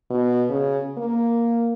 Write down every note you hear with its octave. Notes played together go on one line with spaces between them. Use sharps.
B2
C#3
A#3